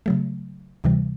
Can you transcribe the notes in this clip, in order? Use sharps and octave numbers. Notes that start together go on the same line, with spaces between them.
C#3 F#3 A3
D2 C3 E3 G3